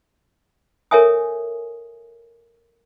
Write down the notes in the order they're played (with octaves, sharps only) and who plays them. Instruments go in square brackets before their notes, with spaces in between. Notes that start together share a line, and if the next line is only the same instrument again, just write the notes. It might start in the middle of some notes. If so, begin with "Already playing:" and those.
[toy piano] A4 A#4 C#5 E5 G#5 D#6